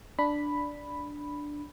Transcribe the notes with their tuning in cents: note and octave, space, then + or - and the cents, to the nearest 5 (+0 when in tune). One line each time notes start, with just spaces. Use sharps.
D4 +0 B5 +0